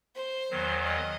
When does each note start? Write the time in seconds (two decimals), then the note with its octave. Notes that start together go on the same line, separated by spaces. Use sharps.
0.15 C5
0.50 E2 D#3 F#3
0.85 D#5